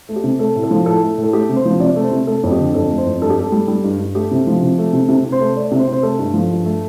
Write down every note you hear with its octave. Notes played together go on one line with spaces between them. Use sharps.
A3
G4
C3
A3 A4
A2
A4
F3
A2 A4
A3
A2
A4
A3 G4
C3
C5
F3
C3 D5
A3
C5
C3
A3 A4
F2
G4
D3
F2 A4
A3
C5
F2
G2 A4
G4
G2 A4
G3
G3
G2
G2
A3 G4
C3
F3
C3
A3
C3
C3
C3
C5
A3
A3 D5
C3
C5
C3
C5
A3 A4
G2
F3
G2
A3